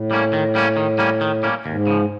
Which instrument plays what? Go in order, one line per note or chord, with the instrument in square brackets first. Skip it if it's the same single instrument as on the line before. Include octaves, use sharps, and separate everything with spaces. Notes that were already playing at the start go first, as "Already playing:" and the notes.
Already playing: [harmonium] A2
[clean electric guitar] G3 A#3 C#4
D#3
G3 A#3 C#4
D#3
G3 A#3 C#4
D#3
G3 A#3 C#4
[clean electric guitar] D#2 [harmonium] G#2
[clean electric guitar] C#3 F3